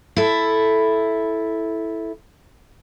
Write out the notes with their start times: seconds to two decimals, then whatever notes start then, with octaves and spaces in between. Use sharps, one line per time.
0.16 E4 A4